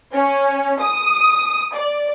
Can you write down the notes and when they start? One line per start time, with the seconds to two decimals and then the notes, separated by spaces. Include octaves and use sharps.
0.14 C#4
0.81 D#6
1.74 D5